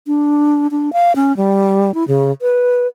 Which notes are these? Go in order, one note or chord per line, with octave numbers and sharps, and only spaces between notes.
D4
D4
F5
C#4
G3
E4
C#3
B4